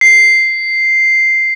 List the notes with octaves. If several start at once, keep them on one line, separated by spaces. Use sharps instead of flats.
C7